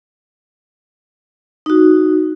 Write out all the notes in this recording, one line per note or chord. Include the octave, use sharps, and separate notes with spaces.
D#4 F#4